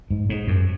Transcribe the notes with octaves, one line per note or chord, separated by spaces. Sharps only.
G#2
G#2
F#2